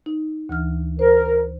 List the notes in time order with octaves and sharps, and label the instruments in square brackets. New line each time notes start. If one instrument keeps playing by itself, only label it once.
[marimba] D#4
D2 E3 F6
[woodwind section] A#4 [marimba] C5